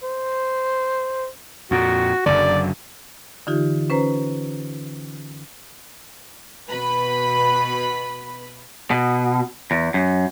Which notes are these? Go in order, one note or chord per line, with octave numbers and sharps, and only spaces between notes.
C5
F2 A#2 F#4
F#1 F#2 D3 D5
D3 E3 D#4 F4 G4
C#4 B4 C5 A#5
B2 B4 B5
B2
E2
F#2